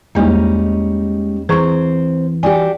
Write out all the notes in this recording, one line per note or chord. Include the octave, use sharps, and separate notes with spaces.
E2 G3 G#3 A#3 C#4 D#4
E3 C4 G#4 C5 A#5 C#6
D4 F#4 G4 G#5